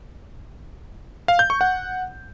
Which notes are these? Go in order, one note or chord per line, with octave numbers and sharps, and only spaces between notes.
F5
G6
C#6
F#5